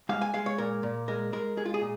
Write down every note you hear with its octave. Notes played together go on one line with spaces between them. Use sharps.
G#3 F5
G#5
G#3 F5
C#5
A#2 A#4
A#2
G#3 A#4
G#3 A#4
G#3 G#4
F4
G#4
A#2